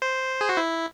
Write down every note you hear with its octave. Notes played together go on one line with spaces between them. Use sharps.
C5
G#4
F#4
E4